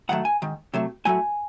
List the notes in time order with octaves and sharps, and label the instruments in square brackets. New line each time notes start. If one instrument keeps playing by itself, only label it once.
[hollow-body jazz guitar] G#2 D#3 F#3 A3 F#5
G#5
G#2 D#3
C3 F#3 A3
A2 F#3 A3 G#5